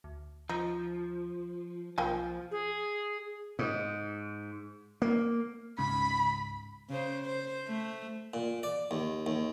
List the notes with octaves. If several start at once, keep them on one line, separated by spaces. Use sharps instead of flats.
D2
F3 D#4
B1 F3 A#3 G5 G#5
G#4
G#2
A#3
C#2 G#2 C#3 B5
C#3 C5
C5
A3
A#2
D5
D#2
D#2